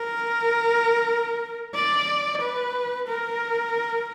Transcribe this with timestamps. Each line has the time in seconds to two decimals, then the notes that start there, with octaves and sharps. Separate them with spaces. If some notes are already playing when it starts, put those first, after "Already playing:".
Already playing: A#4
1.75 D5
2.41 B4
3.08 A#4